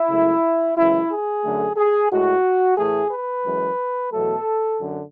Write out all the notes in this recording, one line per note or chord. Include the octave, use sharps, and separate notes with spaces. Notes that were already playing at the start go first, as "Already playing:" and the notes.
Already playing: E4
C#2 C#3 F#3 A3
F#2 C#3 E3 G#3 E4
G#4
F#2 D3 A3
G#4
A2 G#3 F#4
A2 E3 A3 G#4
B4
F#2 E3 G#3
E2 B2 F#3 A3 A4
F#2 D3